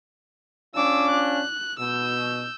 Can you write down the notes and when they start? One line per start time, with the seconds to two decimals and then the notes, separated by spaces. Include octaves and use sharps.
0.75 C#4 D4 F4 D6 E6
1.11 F#6
1.80 B2 E6 G6